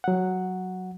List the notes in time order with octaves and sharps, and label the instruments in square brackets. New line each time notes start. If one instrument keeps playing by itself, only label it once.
[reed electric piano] F#3 F#5